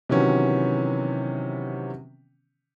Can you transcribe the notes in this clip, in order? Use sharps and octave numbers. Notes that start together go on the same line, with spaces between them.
C3 D#3 E3 F#3 B3 C#4